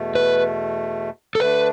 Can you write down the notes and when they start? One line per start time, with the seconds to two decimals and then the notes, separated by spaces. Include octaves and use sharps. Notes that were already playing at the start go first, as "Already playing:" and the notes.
Already playing: E2 B2 A3
0.15 B4
1.35 A4
1.40 D3 A3 D4 B4